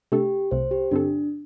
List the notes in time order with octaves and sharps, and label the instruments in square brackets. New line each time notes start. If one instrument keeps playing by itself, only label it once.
[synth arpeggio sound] C3 A3 D4 A4 [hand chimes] G4
[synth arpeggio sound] C2 C3 A3 [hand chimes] C5
[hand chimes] G4
[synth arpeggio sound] G2 D3 C4 A4 [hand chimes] D4